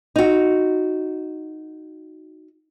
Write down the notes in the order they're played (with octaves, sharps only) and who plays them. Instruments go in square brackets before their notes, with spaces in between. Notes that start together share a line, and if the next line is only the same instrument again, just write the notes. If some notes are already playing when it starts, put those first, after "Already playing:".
[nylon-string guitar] D#4 F#4